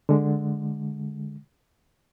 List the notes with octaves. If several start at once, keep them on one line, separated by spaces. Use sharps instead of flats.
D3 G#3